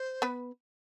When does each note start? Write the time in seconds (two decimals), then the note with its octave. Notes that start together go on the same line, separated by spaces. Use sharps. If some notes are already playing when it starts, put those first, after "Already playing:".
Already playing: C5
0.22 B3 B4